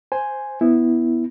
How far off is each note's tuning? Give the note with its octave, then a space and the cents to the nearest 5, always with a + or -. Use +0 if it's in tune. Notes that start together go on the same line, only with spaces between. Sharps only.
C5 +0 G#5 +0
B3 +0 E4 +0